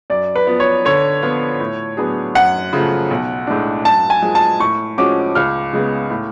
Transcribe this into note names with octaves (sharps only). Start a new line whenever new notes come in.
F#2 D5
B4
F3 B3
C#5
D3 C#5
F3 B3 F4
A2
F#3 B3 D4 G#4
F#2 F#5
C#3 F3 A3
B1
A2 G#3 D4
F#2 A5
G#5
F3 G#3
A5
A2 C#6
F3 G#3 C#4 F#4 D6
C#2 F6
C#3 G#3 B3
A2